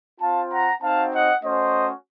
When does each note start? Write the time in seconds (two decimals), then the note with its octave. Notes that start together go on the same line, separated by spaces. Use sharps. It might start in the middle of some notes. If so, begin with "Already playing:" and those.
0.20 C4 F4 F5 A5
0.51 F#5 A#5
0.82 C4 D#4 F#4 F5 A5
1.13 D#5 F#5
1.43 A3 C#4 F#4 C5 D#5